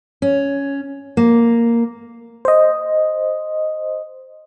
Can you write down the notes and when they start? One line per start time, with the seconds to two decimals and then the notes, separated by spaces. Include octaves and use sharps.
0.22 C#4
1.17 A#3
2.45 C5 D#5